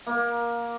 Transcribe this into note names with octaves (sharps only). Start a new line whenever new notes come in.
A#3